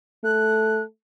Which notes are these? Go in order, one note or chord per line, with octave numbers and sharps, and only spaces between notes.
A3 F#6